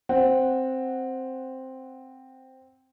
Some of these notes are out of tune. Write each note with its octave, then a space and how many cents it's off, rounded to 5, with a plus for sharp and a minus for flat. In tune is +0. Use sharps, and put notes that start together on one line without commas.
C4 +0 F#5 -5